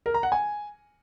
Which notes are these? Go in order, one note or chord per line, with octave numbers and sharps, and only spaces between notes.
A#4
A#5
F#5
G#5